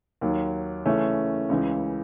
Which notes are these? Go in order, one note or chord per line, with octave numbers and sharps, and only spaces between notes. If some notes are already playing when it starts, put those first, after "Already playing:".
D#2 D#3 F#3
C#3 E3 A3 C#4
C#2 C#3 E3